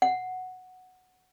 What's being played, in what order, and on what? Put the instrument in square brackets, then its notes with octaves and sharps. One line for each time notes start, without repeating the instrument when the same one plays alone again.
[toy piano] F#5